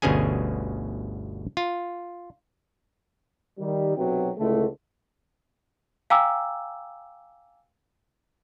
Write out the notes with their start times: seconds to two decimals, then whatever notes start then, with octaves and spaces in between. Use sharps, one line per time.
0.02 G1 D2 B2 C#4 G#4 G#5
1.57 F4
3.59 D#3 G3
3.97 B1 C3 F#3 B3 F#4 G5
4.38 C#2 A2 D3 A3
6.10 F5 G5 G#5 A#5 D6 E6